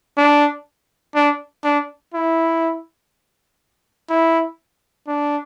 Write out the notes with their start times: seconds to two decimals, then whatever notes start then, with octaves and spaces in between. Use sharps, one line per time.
0.17 D4
1.15 D4
1.64 D4
2.14 E4
4.10 E4
5.07 D4